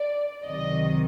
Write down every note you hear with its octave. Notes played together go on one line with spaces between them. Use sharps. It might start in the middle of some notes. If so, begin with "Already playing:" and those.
Already playing: D5
C#2 C3 D#3 F#3 D#5